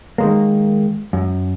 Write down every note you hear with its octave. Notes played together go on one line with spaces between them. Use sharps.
D#3 G#3 A#3
F#2